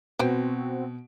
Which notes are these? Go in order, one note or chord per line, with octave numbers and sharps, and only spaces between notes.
B2 C4 F#4 B4 C5 G5